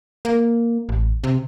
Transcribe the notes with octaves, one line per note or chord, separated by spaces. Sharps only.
A#3
A1
C3